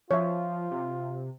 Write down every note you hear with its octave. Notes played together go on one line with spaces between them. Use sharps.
F3 F4 C#5 E5
C3